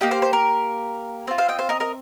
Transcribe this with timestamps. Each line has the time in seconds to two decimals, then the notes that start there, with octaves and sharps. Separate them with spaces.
0.01 A#3 G4 D#5 G5
0.11 C5 F5
0.22 C5
0.33 A#4
1.27 C4 C5
1.31 F4
1.38 C5 F5
1.48 D#5 G5
1.59 C5 F5
1.69 A#4 D#5
1.80 A#4 D#5